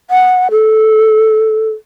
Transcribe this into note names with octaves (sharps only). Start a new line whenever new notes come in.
F#5
A4